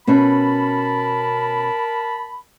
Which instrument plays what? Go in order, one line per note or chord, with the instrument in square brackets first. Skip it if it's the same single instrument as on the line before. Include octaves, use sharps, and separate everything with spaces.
[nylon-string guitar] B2 C#4 E5 [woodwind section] A#4 A5 B5